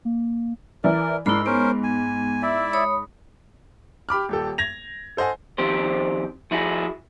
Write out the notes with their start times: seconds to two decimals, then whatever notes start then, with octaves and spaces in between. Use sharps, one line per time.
0.05 A#3
0.84 E3 E4 A#4 D5
1.26 G#2 D4 E4 A#4 B5 C7
1.46 B3 C#4 A#4 C5
1.84 G#5
2.42 E4 D5 E5
2.73 C#5 B5 D#6
4.09 G4 B5 D6 F6
4.29 D#1 G4 A4
4.58 G#6 A#6 F7
5.17 A4 C5 D#5 F#5 G#5
5.58 D#3 F3 C4 G4 C5
6.51 F3 E4 F#4 G#4